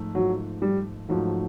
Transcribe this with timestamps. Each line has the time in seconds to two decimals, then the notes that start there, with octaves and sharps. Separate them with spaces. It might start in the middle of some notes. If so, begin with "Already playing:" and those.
Already playing: G#2 F3 A3
0.15 G#2 F3 F#3 A3
0.62 G3
1.09 G#2 F3 F#3 A3